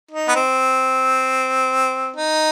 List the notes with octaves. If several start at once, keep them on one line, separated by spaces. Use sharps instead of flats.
D#4
B3
C4
D#4